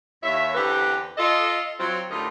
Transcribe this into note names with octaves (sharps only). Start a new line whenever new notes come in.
D#2 C#5 E5
E2 D3 C4 G4 B4
F4 A4 D#5
F#3 C4 F4
D2 A2 D#4 F4 G4 A#4